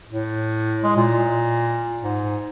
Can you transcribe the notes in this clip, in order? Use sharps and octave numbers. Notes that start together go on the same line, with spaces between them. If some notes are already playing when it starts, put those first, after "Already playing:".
A2
G#3
A#2
G#2